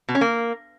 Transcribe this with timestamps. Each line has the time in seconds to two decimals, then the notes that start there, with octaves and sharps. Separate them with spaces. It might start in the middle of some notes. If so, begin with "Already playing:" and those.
0.09 B2
0.15 C#4
0.21 A#3